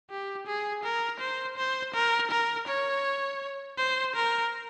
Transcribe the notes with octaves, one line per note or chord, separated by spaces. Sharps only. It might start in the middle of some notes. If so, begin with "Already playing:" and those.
G4
G#4
A#4
C5
C5
A#4
A#4
C#5
C5
A#4